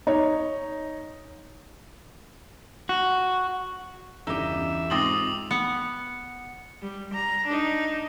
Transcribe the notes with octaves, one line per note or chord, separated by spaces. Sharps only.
D#4 C#5
F#4
G1 E2 C#3 D#4 G4 D5 E5
G#2 C4 D#4 F4 D6 D#6 F#7
B3 C#7
G3
A#5
D4 D#4